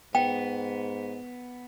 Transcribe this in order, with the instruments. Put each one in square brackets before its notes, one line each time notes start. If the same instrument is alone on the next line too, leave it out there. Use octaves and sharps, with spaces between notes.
[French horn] G#2 [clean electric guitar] B3 [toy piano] G5